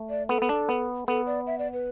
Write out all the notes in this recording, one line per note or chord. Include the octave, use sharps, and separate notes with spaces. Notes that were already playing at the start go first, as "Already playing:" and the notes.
Already playing: A3
D5
B3 A4
B3
D4
B3
B3 A4
D5
E5
D5
B4